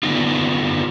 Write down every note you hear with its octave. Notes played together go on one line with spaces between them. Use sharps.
D3 G3 B3 D#4 F4